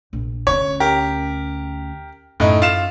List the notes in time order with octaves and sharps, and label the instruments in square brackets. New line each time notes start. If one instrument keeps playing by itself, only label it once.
[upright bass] A#1
[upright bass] D2 C#4 [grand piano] C#5
[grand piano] G4 A#4
[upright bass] F#2 [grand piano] A2 D#4
[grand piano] F4 E7